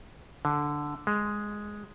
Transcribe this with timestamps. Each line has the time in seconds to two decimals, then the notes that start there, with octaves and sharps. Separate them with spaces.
0.45 D3
1.07 G#3